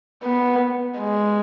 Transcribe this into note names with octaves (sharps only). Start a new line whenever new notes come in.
B3
G#3